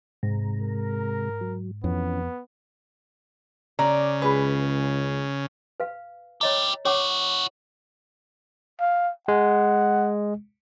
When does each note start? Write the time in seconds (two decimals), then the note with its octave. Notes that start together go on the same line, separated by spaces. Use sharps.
0.23 G#2 C3 G#3 A#5
0.61 A#4
1.41 F#3
1.84 F2 E3 B3 C#4
3.79 C#3 D5 A#5
4.22 C#2 G#4 B4
5.80 B4 F5
6.41 E4 G4 C#5 D#5 A#5
6.85 E4 F#4 C#5 F#5 D6
8.80 F5
9.28 G#3 F#5